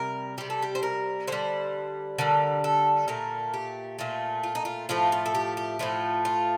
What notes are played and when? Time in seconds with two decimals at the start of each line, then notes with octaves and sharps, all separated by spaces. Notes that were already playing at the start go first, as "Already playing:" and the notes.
Already playing: C3 G3 A#4
0.38 C3 G3 G4
0.50 A4
0.62 G4
0.75 C5
0.83 A#4
1.27 D3 G3 C5
2.18 D3 G3 A#4
2.64 A4
3.08 A#2 A3 A#4
3.54 G4
3.99 A#2 A3 F4
4.43 F4
4.55 D#4
4.65 F4
4.89 A2 F3 A3 F4
5.12 F4
5.26 A4
5.35 G4
5.57 G4
5.79 A2 F3 A3 F4
6.25 F4